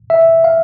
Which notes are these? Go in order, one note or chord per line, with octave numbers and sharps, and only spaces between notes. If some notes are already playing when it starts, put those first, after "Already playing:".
E5
F5